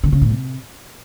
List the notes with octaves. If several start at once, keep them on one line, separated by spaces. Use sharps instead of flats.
D3
C#3
A2
C3